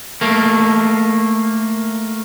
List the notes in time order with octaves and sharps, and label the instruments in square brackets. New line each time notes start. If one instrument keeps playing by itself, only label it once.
[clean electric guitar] A3 A#3